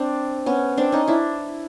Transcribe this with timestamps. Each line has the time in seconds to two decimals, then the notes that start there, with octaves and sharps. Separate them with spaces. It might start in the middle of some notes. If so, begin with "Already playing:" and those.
Already playing: C4 D4
0.46 B3 C#4
0.77 C4 D4
0.92 C#4 D#4
1.08 D4 E4